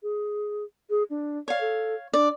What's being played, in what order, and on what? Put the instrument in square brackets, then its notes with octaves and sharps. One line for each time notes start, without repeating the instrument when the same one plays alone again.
[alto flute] G#4
G#4
D4
[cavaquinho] C#5 F5 [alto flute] D5
[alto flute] A4
[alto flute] D4 [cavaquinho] D5